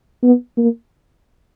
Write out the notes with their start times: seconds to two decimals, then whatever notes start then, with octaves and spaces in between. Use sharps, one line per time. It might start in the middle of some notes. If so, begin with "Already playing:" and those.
0.23 B3
0.57 A#3